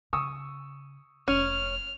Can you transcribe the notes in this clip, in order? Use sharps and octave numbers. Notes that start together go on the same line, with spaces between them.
C#3 C#6 D#6 E6
F1 C#4 F6